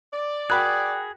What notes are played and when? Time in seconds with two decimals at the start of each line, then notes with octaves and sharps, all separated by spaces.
0.13 D5
0.50 F#4 G#4 A#4 G5 B5 F#6